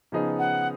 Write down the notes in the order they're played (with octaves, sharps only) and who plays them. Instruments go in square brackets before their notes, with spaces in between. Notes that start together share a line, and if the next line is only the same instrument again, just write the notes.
[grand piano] C#3 F3 B3 D#4 G#4
[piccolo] F#5